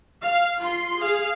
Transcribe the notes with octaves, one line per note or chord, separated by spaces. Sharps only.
F5
F4 C6
G#4 F5